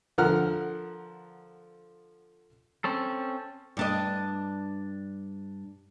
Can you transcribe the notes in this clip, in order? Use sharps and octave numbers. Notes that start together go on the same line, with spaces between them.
D3 F3 A#4 F#5 F6
C4 C#4 A4
G2 D4 D#5